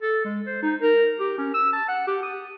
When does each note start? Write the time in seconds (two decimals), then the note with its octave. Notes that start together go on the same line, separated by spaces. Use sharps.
0.02 A4
0.25 G#3
0.46 C5
0.62 D#4
0.82 A#4
1.20 G4
1.38 C#4
1.54 E6
1.73 A5
1.88 F#5
2.07 G4
2.23 D#6